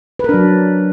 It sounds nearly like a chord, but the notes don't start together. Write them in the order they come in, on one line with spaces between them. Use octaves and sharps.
B4 A#4 D4 F#3